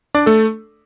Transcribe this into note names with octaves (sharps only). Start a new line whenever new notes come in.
D4 D5
A3 A4